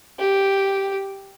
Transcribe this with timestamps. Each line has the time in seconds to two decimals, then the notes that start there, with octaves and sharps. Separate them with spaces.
0.19 G4